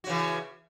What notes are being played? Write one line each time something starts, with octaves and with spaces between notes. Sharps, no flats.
C#3 E3 F#4